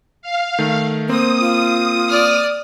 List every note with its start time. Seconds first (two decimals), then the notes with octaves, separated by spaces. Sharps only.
0.22 F5
0.59 D#3 A3
1.09 A#3 C4 C5 D#6
1.40 F4
2.09 D5 F6